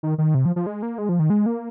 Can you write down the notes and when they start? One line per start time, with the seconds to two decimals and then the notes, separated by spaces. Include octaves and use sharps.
0.03 D#3
0.18 D#3
0.35 C3
0.45 F3
0.56 F3
0.66 G#3
0.83 A#3
0.98 G#3
1.09 F3
1.19 D#3
1.30 G#3
1.46 A#3